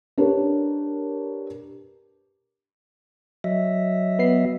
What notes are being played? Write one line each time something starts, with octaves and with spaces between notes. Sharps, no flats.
D4 G4 A#4 B4 C#5
F#3 D#5 E5
B3 C7